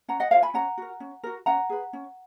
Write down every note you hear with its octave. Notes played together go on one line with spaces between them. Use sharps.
C#4 F#5 A#5
D#5 F#5
F4 A#4 C#5 F5
G#5 B5
C#4 F#5 A#5
F#4 A#4
C#4
F#4 A#4
C#4 F#5 A#5
G#4 B4
C#4